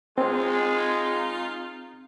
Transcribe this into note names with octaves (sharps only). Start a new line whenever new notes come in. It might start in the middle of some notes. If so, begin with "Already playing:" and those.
G#3 C4 D#4 F4